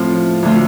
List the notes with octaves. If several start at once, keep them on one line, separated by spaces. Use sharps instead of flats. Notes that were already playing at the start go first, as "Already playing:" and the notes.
Already playing: A2 F3 C4 F4
D2 D3 A3 F4